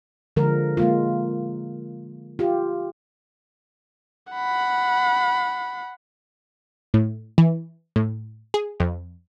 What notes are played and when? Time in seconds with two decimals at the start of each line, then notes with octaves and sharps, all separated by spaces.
0.36 D3 F3 G#3 A#4
0.77 G#3 A#3 F4
2.39 F4 G4
4.33 F#5 B5
6.94 A2
7.38 E3
7.96 A2
8.54 G#4
8.80 F2